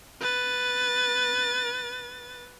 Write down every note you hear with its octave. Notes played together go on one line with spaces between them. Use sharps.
B4 A6